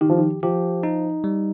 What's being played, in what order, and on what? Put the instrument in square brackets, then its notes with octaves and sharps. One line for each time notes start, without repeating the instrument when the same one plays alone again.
[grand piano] D#3 [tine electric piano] G4
[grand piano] F3
D#3
[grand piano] F3 [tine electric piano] G4
[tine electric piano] D#4
G3